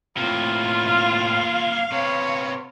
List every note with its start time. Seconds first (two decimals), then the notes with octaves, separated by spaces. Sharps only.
0.17 A2 C3 A#3 B3 F4
0.87 F5
1.92 C3 B3 C#5